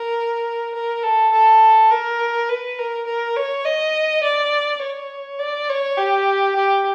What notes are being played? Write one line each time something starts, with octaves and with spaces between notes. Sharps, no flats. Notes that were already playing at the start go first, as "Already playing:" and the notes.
Already playing: A#4
A#4
A4
A4
A#4
B4
A#4
A#4
C#5
D#5
D5
C#5
D5
C#5
G4
G4